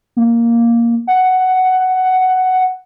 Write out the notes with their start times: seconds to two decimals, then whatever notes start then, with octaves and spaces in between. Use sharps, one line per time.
0.17 A#3
1.07 F#5